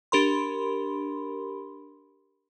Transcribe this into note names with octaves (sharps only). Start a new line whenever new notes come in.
D4 G4 A#4 B5 C6